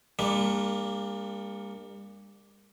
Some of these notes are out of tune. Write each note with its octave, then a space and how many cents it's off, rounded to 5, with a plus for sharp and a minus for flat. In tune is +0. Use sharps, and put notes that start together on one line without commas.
G3 +45 A#3 +0 D4 +15